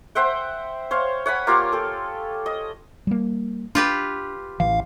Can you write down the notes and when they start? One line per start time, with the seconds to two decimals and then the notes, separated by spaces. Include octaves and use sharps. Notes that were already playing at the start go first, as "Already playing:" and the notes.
0.15 C5 E5 F#5 G5
0.91 C5 C#5 F5
1.26 C#5 F#5 G#5 B5
1.47 A#3 F4 G4 F5
1.72 G4 A4
2.46 D#5
3.07 G3 A#3
3.75 D4 F4 G4 B4
4.60 A1 E3 F5